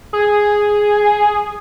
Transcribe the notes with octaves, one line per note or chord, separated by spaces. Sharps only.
G#4